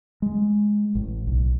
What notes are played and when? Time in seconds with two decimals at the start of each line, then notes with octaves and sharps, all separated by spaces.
0.22 G#3
0.95 A1
1.27 B1